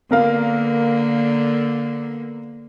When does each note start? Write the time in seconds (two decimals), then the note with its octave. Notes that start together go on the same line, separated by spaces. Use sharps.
0.11 D3 A#3 B3 A#4 F5